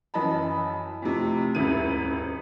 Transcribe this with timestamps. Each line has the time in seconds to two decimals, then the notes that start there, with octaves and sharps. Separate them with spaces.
0.14 F#2 E3 D#5 A5 B5
1.02 F2 A2 C3
1.55 D#1 G#1 C#2 E4 D#7